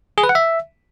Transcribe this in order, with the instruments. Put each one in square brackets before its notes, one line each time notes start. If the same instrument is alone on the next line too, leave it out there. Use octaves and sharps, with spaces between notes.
[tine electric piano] G#4
B4
F#5
E5